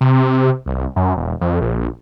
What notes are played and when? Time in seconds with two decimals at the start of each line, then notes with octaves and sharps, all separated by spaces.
0.01 C3
0.66 C2
0.96 F#2
1.17 E1
1.41 F2
1.61 A#1